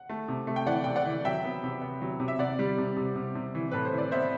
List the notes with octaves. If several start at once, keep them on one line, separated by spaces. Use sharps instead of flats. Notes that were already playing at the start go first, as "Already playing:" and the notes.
Already playing: F#5
A3
C3
A3
G5
E3 D5 F#5
C3 G5
D5 F#5
E3
F#3 E5 G5
B3
C3
B3
F#3
C3
E5
C3 D5 F#5
G3
C3
C3
C3
C3
E3
A2 B4
C5
E3
D5
B3 C5 E5